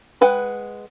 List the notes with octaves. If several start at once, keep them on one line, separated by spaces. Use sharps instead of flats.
G#3 B4 F#5 G5